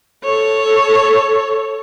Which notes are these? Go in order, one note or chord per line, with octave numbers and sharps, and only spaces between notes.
A4 C#5